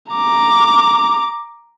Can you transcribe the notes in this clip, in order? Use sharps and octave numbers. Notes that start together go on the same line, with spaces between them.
A#5 D6